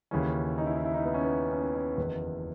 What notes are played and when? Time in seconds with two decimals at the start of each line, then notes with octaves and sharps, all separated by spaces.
0.11 D#2 C#3 E3 C#4
0.58 D#4
0.66 E4
0.77 D#4
0.85 E4
0.94 D#4
1.05 B3
1.14 C#4
1.24 B3
1.51 C#4
1.63 B3
1.75 C#4
1.97 F#1 E2 D#3 B4